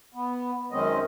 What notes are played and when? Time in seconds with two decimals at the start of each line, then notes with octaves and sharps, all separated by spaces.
0.14 B3
0.72 F#2 D#3 G#3 C4 C#4 D#5